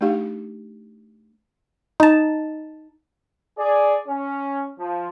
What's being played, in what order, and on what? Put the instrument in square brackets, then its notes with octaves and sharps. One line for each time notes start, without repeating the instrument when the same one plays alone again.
[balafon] A3 D4 D#4 G4 F5
[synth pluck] D#4 A5
[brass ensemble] G#4 D5
C#4
F3